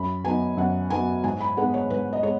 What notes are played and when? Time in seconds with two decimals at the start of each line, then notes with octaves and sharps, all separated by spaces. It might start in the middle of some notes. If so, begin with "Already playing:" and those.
Already playing: F#2 B5
0.24 F#3 B3 D#4 G#5
0.57 F#2 F#5
0.90 F#3 B3 D#4 G#5
1.24 G#2 G#5
1.40 B5
1.57 G#3 B3 D#4 F#5
1.74 C#5
1.90 G#2 B4
2.13 D#5
2.23 G#3 C#5